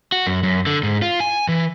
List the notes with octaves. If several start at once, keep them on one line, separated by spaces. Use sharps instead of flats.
F#4
F#2
F#2
D3
G#2
F4
G#5
E3